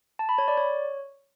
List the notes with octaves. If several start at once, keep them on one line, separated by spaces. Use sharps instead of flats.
A5
B5
C#5
D5
C#5